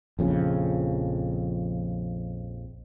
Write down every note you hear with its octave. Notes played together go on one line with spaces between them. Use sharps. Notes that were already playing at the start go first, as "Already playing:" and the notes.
A#1 F2 C#3